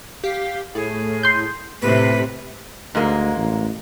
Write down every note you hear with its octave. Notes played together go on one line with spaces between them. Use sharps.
G4 F5
A2 G#4
C6 G6
A2 C3 B4 B6
D2 G#2 G#3 A#3
A1